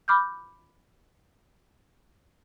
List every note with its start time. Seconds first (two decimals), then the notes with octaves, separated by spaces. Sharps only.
0.08 B5 D6 F6 G6